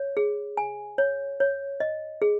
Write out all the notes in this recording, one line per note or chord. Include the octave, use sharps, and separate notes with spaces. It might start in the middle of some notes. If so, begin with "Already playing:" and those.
Already playing: C#5
G#4
G#5
C#5
C#5
D#5
G#4